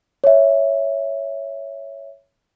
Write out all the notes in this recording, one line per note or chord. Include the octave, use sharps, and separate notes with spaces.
C#5 E5